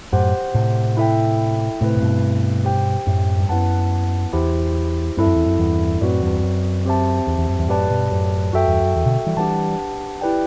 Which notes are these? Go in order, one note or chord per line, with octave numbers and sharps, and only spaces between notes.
F#2 A2 G4 C5 F#5
A2 C3
E4 A4 E5 G5
A2 C3 A3 C4 E4 B4
A2
G2 B2
G4 C5 G5
F#2 A2
G2
F#2 B3 E4 B4 F#5 A5
E2 E4 G4 C5
G2 C4 E4 A4 E5
F#2
E2
F#2
E2 G2
F#2 A2 C4 F#4 B4 D5
E2 G2
F#2
C4 G4 C5 E5 A5
E2
E2
F#2
E2 G2
F#2 A2 G4 B4 D5 A5
G2 B2
F#2 A2
F#2 F#4 A4 E5 G5
E2 G2
F#2
E2
B2 D3
E3 G3
E3 G3 D4 G4 B4 F#5 A5
E4 G4 B4 D5 G5